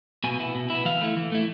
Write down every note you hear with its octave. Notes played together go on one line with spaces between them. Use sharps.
B2 G#5
B3 E4
B2
B3 E4
E3 F5
A3 E4
E3
A3 E4